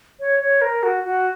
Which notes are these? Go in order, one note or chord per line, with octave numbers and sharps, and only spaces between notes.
C#5
C#5
A#4
F#4
F#4